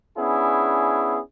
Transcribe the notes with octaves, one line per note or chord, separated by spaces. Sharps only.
B3 C#4 D4 E4 G#4